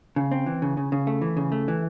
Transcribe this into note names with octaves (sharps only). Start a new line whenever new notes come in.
C#3
C4
E3
C#3
C#3
C#3
A3
E3
C#3
A3
E3